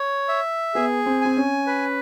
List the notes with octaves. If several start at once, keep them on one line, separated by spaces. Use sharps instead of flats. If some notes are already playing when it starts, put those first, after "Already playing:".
Already playing: C#5
E5
B3 G#4
C4
C4 G#5
C#4
B4